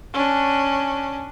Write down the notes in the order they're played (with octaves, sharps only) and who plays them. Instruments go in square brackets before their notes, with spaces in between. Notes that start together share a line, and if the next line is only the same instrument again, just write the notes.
[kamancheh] C#4 D4